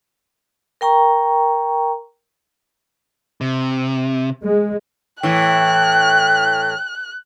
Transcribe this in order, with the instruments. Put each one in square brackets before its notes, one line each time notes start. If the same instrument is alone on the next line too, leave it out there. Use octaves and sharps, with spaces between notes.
[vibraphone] A#4 G5 A#5 C#6
[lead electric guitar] C3
[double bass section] G#3
[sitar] A2 E3 [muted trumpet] G5 [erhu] F#6